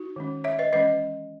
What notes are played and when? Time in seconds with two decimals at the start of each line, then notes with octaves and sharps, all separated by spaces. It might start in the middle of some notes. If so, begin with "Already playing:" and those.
Already playing: D#4 F#4
0.16 D#3 G#3 C#4
0.44 C#5 E5
0.59 B4 D#5
0.73 E3 G#3 C#4 B4 D#5